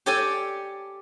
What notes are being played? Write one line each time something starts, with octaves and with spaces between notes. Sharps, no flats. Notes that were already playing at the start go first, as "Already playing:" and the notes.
G4 A4 C#5 D5 G5 G#5